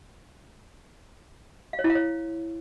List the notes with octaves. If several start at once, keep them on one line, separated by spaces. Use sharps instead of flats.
F5
C#5
E4
F5
C#5